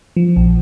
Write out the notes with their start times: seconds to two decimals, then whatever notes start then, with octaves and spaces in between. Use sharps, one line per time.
0.17 F3
0.37 A#1